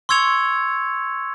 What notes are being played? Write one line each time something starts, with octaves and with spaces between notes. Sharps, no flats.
C6 C#6 E6 G#6 C#7 F7